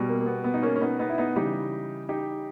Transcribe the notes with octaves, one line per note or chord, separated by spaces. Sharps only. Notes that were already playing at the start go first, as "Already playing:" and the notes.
Already playing: B2 G3
A#3
A#3
B3
B3
D#4
A#3 C#4
C#4
B3 D#4
B3 D#4
E4
B3 D#4
C#3 E3 G3 D#4 G4
D#4 G4